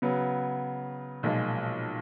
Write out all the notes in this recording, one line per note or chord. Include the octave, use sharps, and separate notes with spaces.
C#3 F#3 B3
B1 A#2 F3 G#3